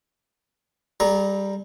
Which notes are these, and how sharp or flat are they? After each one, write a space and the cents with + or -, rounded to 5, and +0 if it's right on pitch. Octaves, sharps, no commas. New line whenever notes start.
G3 +5 A4 -45 A#5 +0